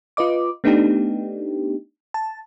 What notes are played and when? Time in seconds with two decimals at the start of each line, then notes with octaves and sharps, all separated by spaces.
0.17 F4 B4 D#5 D6
0.64 A3 B3 D4 D#4 G4
2.14 A5